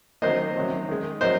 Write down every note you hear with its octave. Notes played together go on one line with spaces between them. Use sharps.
D#3 F#3 A#3 C5 D#5
C3 D#3 F#3
D#3 G#3
F#3 A#3 C5 D#5